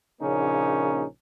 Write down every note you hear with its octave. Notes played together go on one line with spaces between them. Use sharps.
A#1 C#3 A#3 C#4 D#4